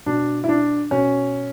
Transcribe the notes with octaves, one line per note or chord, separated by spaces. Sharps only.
B2 D4
E4
D4
B2 C#4